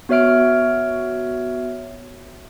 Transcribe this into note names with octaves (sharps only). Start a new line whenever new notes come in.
B3 F#4 C#5 E5 F6 D7